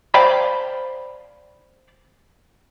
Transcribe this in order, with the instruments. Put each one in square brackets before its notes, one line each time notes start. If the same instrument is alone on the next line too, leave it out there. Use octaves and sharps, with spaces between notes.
[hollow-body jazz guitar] C5 D5 F5 G5 A5 B5